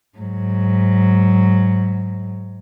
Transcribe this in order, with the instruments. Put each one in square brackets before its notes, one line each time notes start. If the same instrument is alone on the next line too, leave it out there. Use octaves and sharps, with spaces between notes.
[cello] G#2 F#3